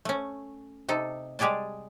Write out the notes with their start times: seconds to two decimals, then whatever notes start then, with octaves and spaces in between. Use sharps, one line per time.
0.05 A3 C#4
0.89 C3 D#4 A4
1.39 G3 G#3 G4 G#4 D5 A5